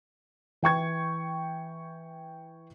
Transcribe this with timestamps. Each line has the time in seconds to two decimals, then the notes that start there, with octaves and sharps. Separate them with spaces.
0.62 E3 G5 C#6 G#6